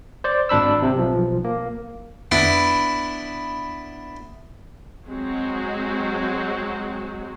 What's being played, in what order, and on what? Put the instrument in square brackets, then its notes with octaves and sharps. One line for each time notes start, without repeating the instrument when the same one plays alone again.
[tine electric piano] C5 D5
G#1 D4 B5 E6
C3
B1 F3
A#3
[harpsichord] B3 D4 E4
[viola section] F#3 G#3 C4 F#4